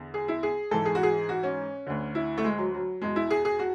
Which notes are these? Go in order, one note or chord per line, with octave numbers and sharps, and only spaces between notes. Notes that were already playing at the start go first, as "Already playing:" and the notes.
Already playing: E2 D3
G#4
E4
G#4
G#2 E3 A4
G#4
F#4
G#4
F#4
C#4
D2 D3
E4
A3
G#3
F#3
F#3
E2 B2 G#3
E4
G#4
G#4
F#4